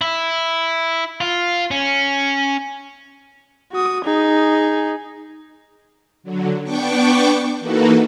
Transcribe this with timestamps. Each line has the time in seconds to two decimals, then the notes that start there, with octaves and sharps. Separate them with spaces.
0.01 E4
1.21 F4
1.71 C#4
3.72 F#4 D#6
4.05 D#4 G#4
6.23 D3 F#3
6.63 B3 D4 G5 C#6 D6
7.59 E3 A#3 D#4 F#4 A4 B4